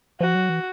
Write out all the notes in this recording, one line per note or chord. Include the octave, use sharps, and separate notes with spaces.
F3 F#4
F#3
E3